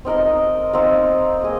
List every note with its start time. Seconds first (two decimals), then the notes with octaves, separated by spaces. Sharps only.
0.05 C4 D#4 A#4 D#5
0.73 C4 D#4 A#4 F5
1.41 A#3 G#4 D#5